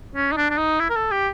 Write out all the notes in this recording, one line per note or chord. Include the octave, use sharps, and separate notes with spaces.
C#4
D#4
D4
D4
D#4
E4
A#4
A4
G4